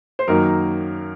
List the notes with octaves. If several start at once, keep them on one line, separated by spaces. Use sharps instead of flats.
C5
F#2 D#3 F#3 A#3 D#4 A#4